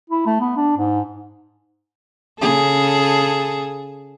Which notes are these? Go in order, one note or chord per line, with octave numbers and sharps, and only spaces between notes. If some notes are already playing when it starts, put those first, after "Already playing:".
E4
A3
B3
D4
G#2
C#3 G#4 A4